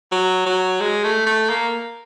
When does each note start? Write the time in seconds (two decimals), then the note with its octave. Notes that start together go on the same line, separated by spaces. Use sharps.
0.12 F#3
0.46 F#3
0.81 G#3
1.04 A3
1.26 A3
1.49 A#3